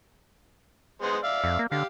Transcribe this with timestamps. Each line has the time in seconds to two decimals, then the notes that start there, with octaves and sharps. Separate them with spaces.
1.02 G#3 B3 C5
1.24 D5 E5 F5
1.44 F2
1.59 A#3
1.72 D3 G4 F5